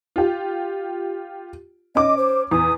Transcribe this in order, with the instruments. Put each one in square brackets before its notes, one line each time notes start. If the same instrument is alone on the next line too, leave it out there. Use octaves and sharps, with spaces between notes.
[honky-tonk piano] F4 G4
[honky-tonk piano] C#4 D6 [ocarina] D#5
[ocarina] C5
[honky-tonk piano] E2 [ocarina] D#6